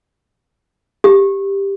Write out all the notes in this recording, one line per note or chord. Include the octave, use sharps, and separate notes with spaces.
G4